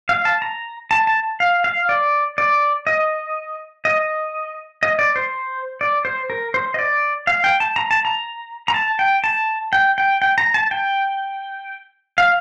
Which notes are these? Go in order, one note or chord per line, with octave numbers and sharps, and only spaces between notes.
F5
A5
A#5
A5
A5
F5
F5
D5
D5
D#5
D#5
D#5
D5
C5
D5
C5
A#4
C5
D#5
D5
F5
G5
A5
A#5
A5
A#5
A#5
A5
G5
A5
G5
G5
G5
A#5
A5
G5
F5